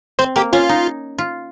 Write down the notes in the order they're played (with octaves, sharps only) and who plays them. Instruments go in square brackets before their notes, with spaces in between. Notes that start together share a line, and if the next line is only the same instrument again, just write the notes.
[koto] C4 [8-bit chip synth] C5
[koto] A#3 [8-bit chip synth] G4
[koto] C#4 [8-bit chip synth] F4
[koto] D#4
F4